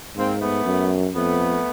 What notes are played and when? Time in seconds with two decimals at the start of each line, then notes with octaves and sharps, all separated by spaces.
0.16 G#2 A#3 C4
0.41 A3 B3
0.65 F#2
1.15 F2 A3 B3